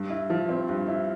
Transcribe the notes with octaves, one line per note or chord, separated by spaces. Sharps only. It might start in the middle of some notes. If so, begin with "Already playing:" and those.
Already playing: G2
E4
F3
C4
G2
E4